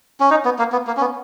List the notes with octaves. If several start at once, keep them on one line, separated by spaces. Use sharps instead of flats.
C#4
D#4
B3
A#3
B3
A#3
C#4
B3